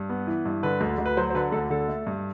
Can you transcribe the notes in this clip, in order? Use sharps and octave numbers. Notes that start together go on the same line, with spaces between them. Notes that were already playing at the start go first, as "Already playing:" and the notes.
Already playing: G2
B3
E3
G2
D3 B4
D2
D2
B4
F#3 C5
C5
D3 B4
D2 A4
D3 A4
A3
G2